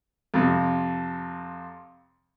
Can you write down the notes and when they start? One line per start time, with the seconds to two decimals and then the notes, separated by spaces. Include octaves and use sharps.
0.34 F2 C3